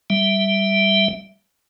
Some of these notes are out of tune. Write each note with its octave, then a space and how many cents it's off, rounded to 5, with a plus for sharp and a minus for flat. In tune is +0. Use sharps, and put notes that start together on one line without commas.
G3 +0 E5 +0